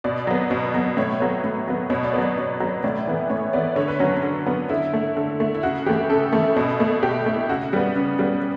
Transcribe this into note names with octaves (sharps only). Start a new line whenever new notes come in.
B2 D5
F#3 B3
B2
F#3 B3
A2 C#5
F#3 B3
A2
F#3 B3
B2 C#5
D5
F#3 B3 C#5
B2
F#3 B3
A2 D5
E3 B3
A2 C#5
E3 B3 D5
D3 C#5
B4
F#3 B3 C#4
D4
D3
F#3 B3
D3 E4
A3
D3
A3
E4
C#3 F#4
E3 A3 G4
C#3 A4
E3 A3
B2
A3
B2 G4
A3
E4
C#3 F#4
G3 B3
C#3
G3 B3